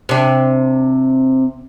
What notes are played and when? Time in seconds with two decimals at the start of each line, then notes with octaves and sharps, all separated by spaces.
0.09 C3 D4